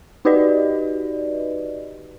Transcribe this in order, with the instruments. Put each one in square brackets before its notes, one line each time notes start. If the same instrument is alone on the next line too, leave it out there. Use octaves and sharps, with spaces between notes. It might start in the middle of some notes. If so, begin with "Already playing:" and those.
[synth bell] D#4 F#4 G4 B4 D5 D#5